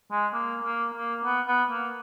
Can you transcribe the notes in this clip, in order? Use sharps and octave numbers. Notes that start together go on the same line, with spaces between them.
G#3
A#3
A#3
A#3
B3
B3
A#3